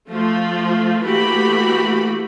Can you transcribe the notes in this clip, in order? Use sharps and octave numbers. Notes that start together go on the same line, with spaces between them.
F3 A3 F4
E3 A3 A#3 F#4 G4 B5